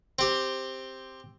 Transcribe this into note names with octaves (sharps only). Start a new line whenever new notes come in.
C4 G4